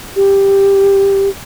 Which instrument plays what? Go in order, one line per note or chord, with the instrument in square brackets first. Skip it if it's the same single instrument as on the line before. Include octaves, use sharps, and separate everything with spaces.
[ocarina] G4